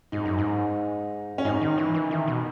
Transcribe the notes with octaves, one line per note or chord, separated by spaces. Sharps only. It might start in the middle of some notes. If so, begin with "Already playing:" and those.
G#2 D#4
F#2
G#2
C#4
G#2 D#4
D#3
E3
E3
D#3 E4
B2